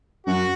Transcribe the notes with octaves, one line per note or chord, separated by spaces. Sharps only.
F#2 F#4